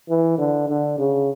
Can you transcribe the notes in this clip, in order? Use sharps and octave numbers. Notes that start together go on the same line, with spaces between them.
E3
D3
D3
C#3